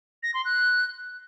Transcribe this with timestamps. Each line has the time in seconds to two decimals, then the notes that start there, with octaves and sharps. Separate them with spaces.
0.23 A#6
0.34 C6
0.45 F#6